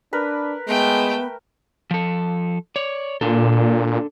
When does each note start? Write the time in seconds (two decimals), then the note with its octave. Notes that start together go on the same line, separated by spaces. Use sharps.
0.13 D4 A#4 B4
0.68 G#3 A3 B3 G5
1.91 F3 A4
2.76 C#5 D5
3.21 A#2 D4 A4